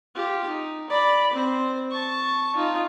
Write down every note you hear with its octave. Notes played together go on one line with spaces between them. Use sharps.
F4 G4
D#4
D5 B5
C4 C5
A5 C#6
D#4 F4